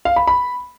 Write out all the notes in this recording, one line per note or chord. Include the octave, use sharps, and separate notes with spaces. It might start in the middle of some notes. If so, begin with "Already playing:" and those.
F5
B5
B5